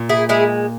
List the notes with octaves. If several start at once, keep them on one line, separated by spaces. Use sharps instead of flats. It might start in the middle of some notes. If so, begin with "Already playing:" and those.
Already playing: A#2
E4 G#4
G#3 E4 G#4